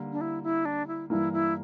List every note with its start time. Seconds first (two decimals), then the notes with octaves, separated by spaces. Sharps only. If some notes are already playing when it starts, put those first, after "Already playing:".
Already playing: D3 G3 A#3
0.13 D4
0.21 E4
0.43 E4
0.65 D4
0.87 E4
1.10 G2 E3 A#3 E4
1.33 E4